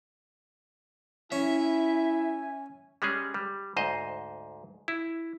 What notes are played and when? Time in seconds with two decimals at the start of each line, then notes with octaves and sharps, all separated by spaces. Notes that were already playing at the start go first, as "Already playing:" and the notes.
1.32 C#4 E4 E5 G#5
3.02 G3 G#3 C#4 G#4
3.34 G3
3.76 D2 G#2 C5 D#5
4.88 E4